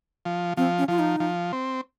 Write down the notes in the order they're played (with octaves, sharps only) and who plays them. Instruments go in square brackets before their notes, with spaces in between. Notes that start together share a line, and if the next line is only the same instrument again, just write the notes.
[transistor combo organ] F3
[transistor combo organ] F3 [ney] C4
[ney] C#4
[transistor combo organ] F3 [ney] F4
[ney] D#4
[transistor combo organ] F3
C4